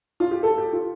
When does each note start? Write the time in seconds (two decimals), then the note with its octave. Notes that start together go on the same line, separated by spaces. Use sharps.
0.20 F4
0.31 G4
0.43 A4
0.58 G4
0.73 F4